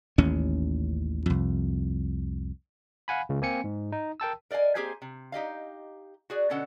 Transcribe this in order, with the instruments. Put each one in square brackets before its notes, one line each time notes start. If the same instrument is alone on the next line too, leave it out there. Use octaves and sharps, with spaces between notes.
[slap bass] A1 D#2 C#4
C2 F2
[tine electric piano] F5 F#5 G#5 B5
C#2 C#3
A#3 C4 G#5 C#7
G#2
D#4
A#4 G5 A5 E6
[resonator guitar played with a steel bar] A#4 D5 D#5 F5 G#5
A#3 C4 G4 G#4 C5 G#5
C3
D#4 G4 D#5 F5
F#4 G#4 D5
B2 D3 C#4 A4 D#5 F#5